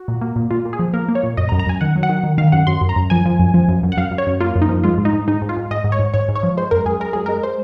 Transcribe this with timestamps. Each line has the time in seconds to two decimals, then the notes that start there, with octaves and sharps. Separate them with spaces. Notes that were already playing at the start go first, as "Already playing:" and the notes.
Already playing: F#4
0.08 A#2
0.21 A#3
0.36 A#2
0.51 A#2 F4
0.65 A#2
0.73 G#4
0.79 F3
0.94 A#3 A#4
1.08 A#3
1.15 C#5
1.23 A#2
1.37 F#2 D#5
1.49 A#5
1.52 F#2
1.59 A#5
1.67 F#2 G#5
1.81 D#3 F#5
1.96 F#3
2.03 F#5
2.09 D#3
2.23 D#3
2.38 D#3 F5
2.52 F#2 F#5
2.67 F#2 C6
2.81 F#2
2.89 A#5
2.96 F#2
3.10 F3 G#5
3.26 F3
3.39 F#2
3.54 F3
3.68 F#2
3.83 F#2
3.92 F#5
3.97 F#2 F5
4.11 F#2
4.18 C#5
4.27 F#2
4.40 A#3 F4
4.55 F#2
4.62 D#4
4.69 F3
4.84 G#3 F4
4.98 G#2
5.05 D#4
5.13 G#2
5.28 G#2 D#4
5.42 G#2
5.49 F4
5.57 G#2
5.71 G#2 D#5
5.84 G#2
5.92 C#5
5.99 G#2
6.14 G#2 C#5
6.28 G#2
6.35 C#5
6.43 F3
6.57 G#3 C5
6.71 F#2 A#4
6.85 F#2 G#4
7.00 G#3 A#4
7.13 F#2 G#4
7.26 G#3 A#4
7.43 C5